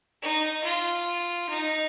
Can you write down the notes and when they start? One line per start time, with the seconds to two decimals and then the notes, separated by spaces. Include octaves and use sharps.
0.22 D#4
0.64 F4
1.49 D#4